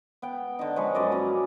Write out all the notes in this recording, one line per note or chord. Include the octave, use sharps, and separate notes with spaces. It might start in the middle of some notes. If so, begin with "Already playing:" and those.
B3 G5
D3 D#4
F3 G#3 B4 C#5
F#2 D5 D#5
A#3 C#4